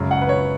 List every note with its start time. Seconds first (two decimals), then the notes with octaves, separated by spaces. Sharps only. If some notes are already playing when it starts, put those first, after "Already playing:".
Already playing: F#2 C#3 G#3
0.11 F#5
0.21 B4
0.29 C#5